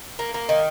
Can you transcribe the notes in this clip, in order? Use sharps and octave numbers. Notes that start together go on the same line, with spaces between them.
A#3
A#3
D#3